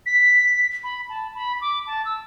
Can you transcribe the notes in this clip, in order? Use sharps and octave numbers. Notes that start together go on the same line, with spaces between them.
B6
B5
A5
B5
D6
A5
E6